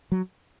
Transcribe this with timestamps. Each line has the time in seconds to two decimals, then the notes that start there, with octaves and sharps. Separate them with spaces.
0.12 F#3